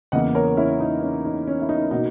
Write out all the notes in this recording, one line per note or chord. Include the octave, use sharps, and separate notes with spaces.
E2 C#3 E3 A#3 D#5 F#5
A#4 C#5
C#4 E4
D#4
C#4
D#4
C#4
E4
D#4
B2 A#3 D#4 F#4